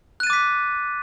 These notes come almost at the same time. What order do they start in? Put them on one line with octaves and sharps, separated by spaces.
F#6 D#7 A6 D6 B6